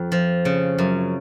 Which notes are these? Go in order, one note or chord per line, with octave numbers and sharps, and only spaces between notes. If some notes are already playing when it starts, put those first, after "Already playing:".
Already playing: F2
F3
C#3
F#2